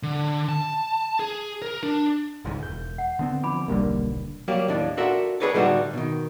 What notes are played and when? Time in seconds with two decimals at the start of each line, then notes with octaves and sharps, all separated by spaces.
0.03 D3
0.49 A5
1.20 G#4
1.62 A#4
1.83 D4
2.45 G1 C#2 G#2
2.63 E1 G6
2.98 F#5
3.19 D3 B3 C4
3.44 F3 D4 B5 D6
3.68 D#1 B1 D3 G3 A#3
4.48 F#3 G3 A#3 G4
4.68 D#2 A2 D4
4.97 D4 F4 F#4 A4 A#4 E5
5.40 D4 G#4 A4 B4 C#5 D5
5.54 A2 D3 G3 D#4 F#4 A4
5.93 B2 D#3